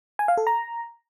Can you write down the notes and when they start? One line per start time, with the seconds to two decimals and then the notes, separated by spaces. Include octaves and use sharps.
0.19 G#5
0.28 F5
0.37 A4
0.47 A#5